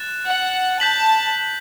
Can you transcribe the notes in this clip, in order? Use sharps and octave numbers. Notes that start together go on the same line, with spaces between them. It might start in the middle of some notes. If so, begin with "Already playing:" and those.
Already playing: F#6 A6 E7
F#5
A5 G6 B6 F#7